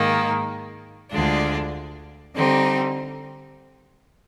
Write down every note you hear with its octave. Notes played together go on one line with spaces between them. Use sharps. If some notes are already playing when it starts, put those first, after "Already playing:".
Already playing: G#2 D#3 A#3 D#4
D2 D3 G#3 D4 F4
D3 G3 C4 D#4